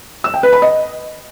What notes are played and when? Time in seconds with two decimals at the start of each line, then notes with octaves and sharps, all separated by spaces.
0.24 E6
0.34 G5
0.43 B4
0.53 B5
0.62 D#5